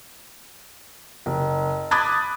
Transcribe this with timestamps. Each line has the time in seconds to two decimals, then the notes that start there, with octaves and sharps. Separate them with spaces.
1.26 F#1
1.91 B5 D6 D#6 F#6 G#6 A6